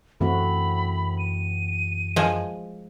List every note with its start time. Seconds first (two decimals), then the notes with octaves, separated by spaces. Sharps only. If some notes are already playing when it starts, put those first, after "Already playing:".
0.21 F#2 E3 A3 C4 F#4 B5
1.19 D#7
2.16 F3 G#3